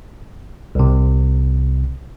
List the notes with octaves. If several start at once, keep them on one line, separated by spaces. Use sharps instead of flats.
C2 C3